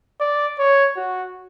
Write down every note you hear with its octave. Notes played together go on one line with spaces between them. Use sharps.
D5
C#5
F#4